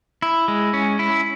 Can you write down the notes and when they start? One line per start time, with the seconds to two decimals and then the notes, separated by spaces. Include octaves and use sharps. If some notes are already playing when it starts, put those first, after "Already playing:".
0.22 E4
0.48 G#3
0.74 C#4
0.99 E4